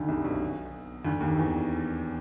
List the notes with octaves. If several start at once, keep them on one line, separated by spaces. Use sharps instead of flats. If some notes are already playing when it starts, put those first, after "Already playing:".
Already playing: D2 D3 D#3
C2 C3
B1 B2
D2 D3
D#2 D#3
E2 E3